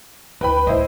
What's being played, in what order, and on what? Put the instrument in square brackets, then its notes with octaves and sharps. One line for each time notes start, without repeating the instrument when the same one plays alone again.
[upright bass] D2 [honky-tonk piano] B4 G5 B5
[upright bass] D2 A2 [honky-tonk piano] E4 C5 D#5